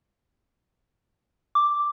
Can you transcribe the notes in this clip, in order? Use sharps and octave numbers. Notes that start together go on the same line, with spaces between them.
D6